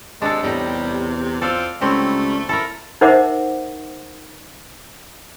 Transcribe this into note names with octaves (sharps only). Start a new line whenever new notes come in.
C3 G#3 D4 A4
E2 A2 G3 D#4 G5
C4 F4 A4 D5 F5
C#2 F#3 G3 A3 C4 E4
E4 A4 A#4
D#4 A#4 C5 E5 F#5 D6